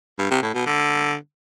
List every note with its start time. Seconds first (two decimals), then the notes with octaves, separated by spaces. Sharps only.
0.19 G2
0.30 C3
0.42 A2
0.54 B2
0.66 D3